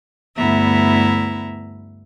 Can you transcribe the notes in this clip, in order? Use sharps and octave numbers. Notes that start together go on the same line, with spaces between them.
D2 G2 B3 E4 E5 A#5